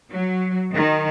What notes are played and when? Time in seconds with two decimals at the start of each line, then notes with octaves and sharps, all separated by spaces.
0.10 F#3
0.72 D#3